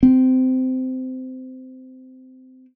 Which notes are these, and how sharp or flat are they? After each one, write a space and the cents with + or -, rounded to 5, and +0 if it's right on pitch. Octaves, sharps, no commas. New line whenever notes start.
C4 -20